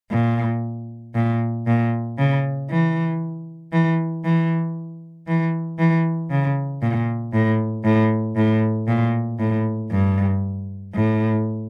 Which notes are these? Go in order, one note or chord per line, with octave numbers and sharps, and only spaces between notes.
A#2
A#2
A#2
C#3
E3
E3
E3
E3
E3
C#3
A#2
A2
A2
A2
A#2
A2
G2
A2